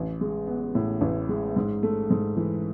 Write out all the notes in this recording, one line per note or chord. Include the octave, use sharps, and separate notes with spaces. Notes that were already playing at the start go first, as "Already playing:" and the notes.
Already playing: A1
G#3
B3
A2
A1
G#3
G#2
A3
G#2
E3